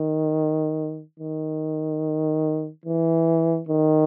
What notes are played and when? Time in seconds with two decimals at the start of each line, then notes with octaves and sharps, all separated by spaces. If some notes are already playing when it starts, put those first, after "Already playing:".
Already playing: D#3
1.20 D#3
2.86 E3
3.69 D#3